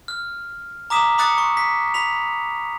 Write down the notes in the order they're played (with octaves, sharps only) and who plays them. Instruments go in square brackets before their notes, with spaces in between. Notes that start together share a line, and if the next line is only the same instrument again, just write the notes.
[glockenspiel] F6
A#5 D6 D#6 B6 E7
B5 D6 D#6 F#6 A6 C#7
C#6
B6
B5 B6 F7